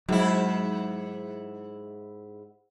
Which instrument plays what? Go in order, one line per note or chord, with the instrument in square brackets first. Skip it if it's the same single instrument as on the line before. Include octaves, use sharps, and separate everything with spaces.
[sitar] G#2 E4 [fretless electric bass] F#3 G#3